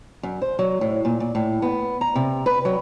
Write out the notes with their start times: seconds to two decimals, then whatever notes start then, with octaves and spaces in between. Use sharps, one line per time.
0.23 F#2
0.42 C5
0.59 F#3
0.81 A2
1.05 A#2
1.20 A#2
1.35 A2
1.62 B3
2.01 A#5
2.16 C3
2.46 B4
2.65 F#3